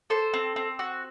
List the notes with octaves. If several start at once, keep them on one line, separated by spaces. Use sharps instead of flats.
A4 C5
C4
C4
F#4